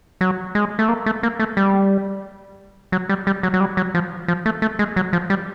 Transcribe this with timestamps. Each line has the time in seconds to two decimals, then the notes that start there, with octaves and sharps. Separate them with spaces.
0.21 F#3
0.55 G#3
0.79 A3
0.89 A#3
1.06 A3
1.23 A#3
1.40 A3
1.57 G3
2.92 F#3
3.09 G3
3.27 G3
3.43 F#3
3.54 F#3
3.60 G3
3.77 F#3
3.95 F3
4.28 F3
4.46 A3
4.62 A3
4.79 G#3
4.96 F#3
5.13 F3
5.30 G3